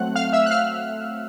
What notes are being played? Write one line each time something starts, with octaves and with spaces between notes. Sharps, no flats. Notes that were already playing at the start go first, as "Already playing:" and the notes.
Already playing: F#3 A3 C4 F#5 F#6
F5 F6
E5 E6
F#6
F5 F6